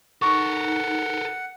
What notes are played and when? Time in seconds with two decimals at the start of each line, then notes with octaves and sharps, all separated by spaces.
0.22 D#4 A4 A#4 F#5 C#6